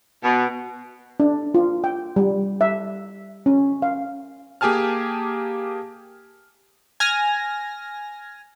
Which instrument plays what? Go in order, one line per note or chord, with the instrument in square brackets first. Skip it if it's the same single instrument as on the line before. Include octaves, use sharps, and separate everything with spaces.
[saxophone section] B2
[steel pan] D4
F4
G5
G3
E5
C#4
F5
[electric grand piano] A#3 G4 G#4 G#5 A5 F6
[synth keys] G#5 F6 A#6